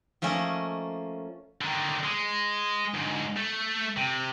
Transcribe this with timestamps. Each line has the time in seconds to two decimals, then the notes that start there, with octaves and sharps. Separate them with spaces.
0.22 F3 A3 A#3 C#4 A4 D#5
1.61 D3 D#3
2.04 G#3
2.95 D2 G#2
3.37 A3
3.97 C3